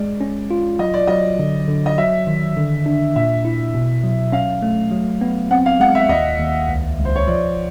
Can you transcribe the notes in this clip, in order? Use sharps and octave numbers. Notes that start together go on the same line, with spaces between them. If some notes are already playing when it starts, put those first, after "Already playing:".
Already playing: G#3 D5
C#4
F4
F#3 D#5
D5
F#3 D#5
D3
D3
D#5
F#3 E5
D#3
D3
D4
A#2 E5
E4
B2
F#3
C#4 F5
A3
F#3
B3
C4 F#5
F5
G#3 F#5
E5
D#2 D#5
D#2
C#2
C#2
C5
C#5
F3 D5